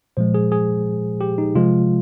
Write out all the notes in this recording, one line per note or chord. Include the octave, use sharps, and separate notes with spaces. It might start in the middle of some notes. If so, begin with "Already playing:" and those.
A#2 F3 G#3 C5
G#4
G#4
G4
D#4
C3 F3 G#3 F4